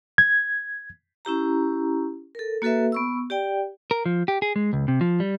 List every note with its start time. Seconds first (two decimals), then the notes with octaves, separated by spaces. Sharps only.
0.18 G#6
1.25 C#4 E4 G4 A#5
2.35 A4 A#4
2.62 A#3 F#4 A4 B4 E5
2.92 B3 C#6 E6
3.30 G4 D5 G5
3.91 A#4
4.06 F3
4.28 G4
4.42 G#4
4.56 G#3
4.73 C#2
4.88 C3
5.01 F3
5.20 G3